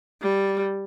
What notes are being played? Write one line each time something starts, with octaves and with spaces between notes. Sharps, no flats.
G3